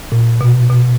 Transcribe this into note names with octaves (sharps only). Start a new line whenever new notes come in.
A#2
B2
B2